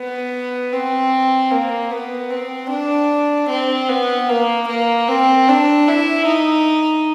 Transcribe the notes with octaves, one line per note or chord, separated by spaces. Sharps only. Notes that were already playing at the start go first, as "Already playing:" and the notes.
Already playing: B3
C4
A#3
B3
C4
D4
C4
B3
A#3
A#3
C4
D4
E4
D#4